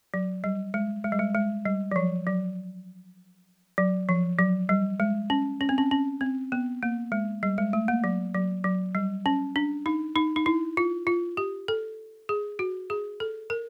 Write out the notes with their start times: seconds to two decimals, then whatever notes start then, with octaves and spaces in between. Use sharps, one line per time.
0.14 F#3
0.44 G3
0.74 G#3
1.04 G#3
1.12 G3
1.19 G#3
1.35 G#3
1.66 G3
1.92 F#3
1.96 F3
2.27 F#3
3.78 F#3
4.09 F3
4.39 F#3
4.69 G3
5.00 G#3
5.30 C#4
5.61 C#4
5.69 C4
5.78 C#4
5.91 C#4
6.21 C4
6.52 B3
6.83 A#3
7.12 G#3
7.43 G3
7.58 G#3
7.73 A3
7.88 A#3
8.04 F#3
8.34 F#3
8.64 F#3
8.95 G3
9.26 C#4
9.56 D4
9.86 D#4
10.16 D#4
10.36 D#4
10.46 E4
10.77 F4
11.07 F4
11.37 G4
11.68 A4
12.29 G#4
12.59 F#4
12.90 G#4
13.20 A4
13.50 A#4